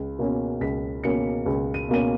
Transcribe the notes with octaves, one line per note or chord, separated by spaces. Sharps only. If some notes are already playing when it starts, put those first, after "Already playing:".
Already playing: C#2
B2 A#3 C#4
C#2 B6
B2 A#3 C#4 C#7
C#2
D#7
B2 A#3 C#4 D#7